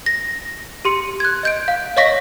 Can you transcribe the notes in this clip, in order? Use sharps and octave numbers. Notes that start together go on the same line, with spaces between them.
A#6
G4 C6 C#7
F#6 G#6
D#5 G6 D7
F5
C#5 D#5 F5 C#6 A#6 B6